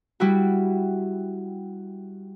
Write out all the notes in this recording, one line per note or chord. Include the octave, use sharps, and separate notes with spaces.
G3 E4 F#4